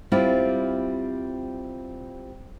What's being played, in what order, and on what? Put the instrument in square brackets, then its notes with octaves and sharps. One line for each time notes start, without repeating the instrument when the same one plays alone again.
[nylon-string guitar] G3 C4 E4 F4 G4